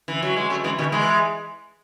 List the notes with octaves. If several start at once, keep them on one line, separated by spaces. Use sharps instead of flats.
E3
F#3
G#3
F#3 A3
E3 G#3
B2 D#3
E3 G#3